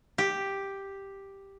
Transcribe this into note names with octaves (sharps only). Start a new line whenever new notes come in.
G4